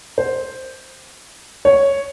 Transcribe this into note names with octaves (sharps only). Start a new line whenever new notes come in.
C5
C#5